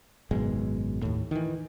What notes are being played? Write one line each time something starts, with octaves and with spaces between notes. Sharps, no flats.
G#1 F#2 B2 G#3
D#2 A2
D#3 E3